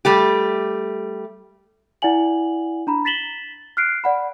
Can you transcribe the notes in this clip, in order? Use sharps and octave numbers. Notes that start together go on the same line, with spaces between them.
G3 A3 G4
E4 D5 F#5 G#5 F#7
D4 A#5 B5
A6 B6 E7 F#7 G7
F6 F#6 C7 D7
D5 F#5 B5